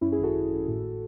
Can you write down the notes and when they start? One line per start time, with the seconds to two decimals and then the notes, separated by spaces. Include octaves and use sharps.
0.01 F#2 C#4 E4
0.12 E4 G#4
0.18 G#1
0.23 F#4 A4
0.34 G#1
0.51 G#1
0.68 A2